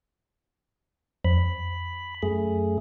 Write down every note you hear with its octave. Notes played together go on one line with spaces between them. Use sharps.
F2 B5
F#2 A3 G#4